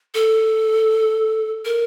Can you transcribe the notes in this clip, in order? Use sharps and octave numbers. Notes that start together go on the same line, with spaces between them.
A4
A#4